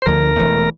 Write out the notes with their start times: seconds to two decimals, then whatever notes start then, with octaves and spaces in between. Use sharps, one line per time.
0.02 C5
0.06 D2 D3 F3 A#4
0.37 E1 E2 E3 A3